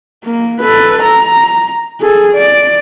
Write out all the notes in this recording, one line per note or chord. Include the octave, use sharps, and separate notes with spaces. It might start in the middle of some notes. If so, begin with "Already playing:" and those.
A#3
A4 B4
A#5
G#4 A4
D5